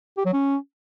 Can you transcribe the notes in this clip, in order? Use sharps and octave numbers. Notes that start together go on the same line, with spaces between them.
G4
F#3
C#4